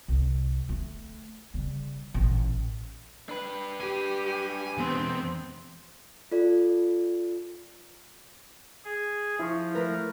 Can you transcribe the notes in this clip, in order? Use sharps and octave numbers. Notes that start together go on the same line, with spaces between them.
C2
A3
C#3 G3
A1 A#2
D4 B4
G4 G#5
E2 G#3 B3 C4
F4 A4 D5
G#4
F3 E4 C#6
A3 A#4 B4